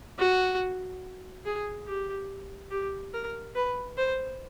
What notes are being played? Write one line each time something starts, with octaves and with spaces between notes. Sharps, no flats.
F#4
G#4
G4
G4
A#4
B4
C5